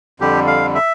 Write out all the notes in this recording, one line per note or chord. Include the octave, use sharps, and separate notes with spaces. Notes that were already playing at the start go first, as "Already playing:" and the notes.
F2 D3 G3 G4
F5
E5